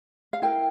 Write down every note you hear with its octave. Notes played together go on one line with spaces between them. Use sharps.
F5
E4 A#4 G5